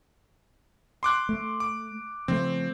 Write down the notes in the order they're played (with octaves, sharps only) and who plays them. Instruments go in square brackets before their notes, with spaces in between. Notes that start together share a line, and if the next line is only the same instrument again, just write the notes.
[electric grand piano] C6 D6 F#6
[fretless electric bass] A3
[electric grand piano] D6
[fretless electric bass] C#3 F3 A3 [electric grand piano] C4